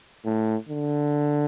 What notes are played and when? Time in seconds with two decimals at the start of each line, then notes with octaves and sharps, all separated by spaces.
0.25 A2
0.68 D3